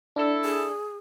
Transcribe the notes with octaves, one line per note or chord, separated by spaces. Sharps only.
D4 E4 A4
G#4